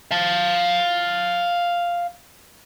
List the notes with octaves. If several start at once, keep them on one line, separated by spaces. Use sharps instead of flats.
F5 A5